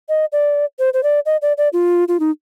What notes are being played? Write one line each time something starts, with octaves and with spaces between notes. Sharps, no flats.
D#5
D5
C5
C5
D5
D#5
D5
D5
F4
F4
D#4